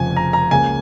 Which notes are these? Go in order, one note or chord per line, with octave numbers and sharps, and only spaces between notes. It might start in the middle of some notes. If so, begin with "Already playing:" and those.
Already playing: F1 F2 C#3 F3 G#5
A#5
A#5
C#2 C#3 A#3 G#5